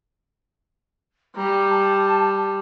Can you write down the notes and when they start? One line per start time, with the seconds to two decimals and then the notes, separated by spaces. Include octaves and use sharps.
1.36 G3 A#5
1.70 A5